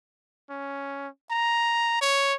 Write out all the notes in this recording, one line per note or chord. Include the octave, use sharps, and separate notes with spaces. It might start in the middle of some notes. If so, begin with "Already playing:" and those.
C#4
A#5
C#5